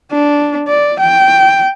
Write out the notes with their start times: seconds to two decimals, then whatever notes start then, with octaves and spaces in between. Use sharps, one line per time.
0.12 D4
0.68 D5
1.00 G5